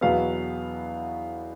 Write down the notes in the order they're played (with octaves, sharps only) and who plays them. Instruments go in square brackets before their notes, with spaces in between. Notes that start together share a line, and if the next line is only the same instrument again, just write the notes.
[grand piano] E2 B2 F#3 B3 F5